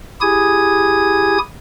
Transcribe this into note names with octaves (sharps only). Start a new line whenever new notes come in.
E4 G4 G#4 G#5 D#6 G#6